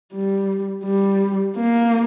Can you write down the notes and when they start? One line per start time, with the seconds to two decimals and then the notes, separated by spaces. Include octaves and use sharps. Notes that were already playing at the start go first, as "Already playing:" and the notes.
0.13 G3
0.85 G3
1.57 A#3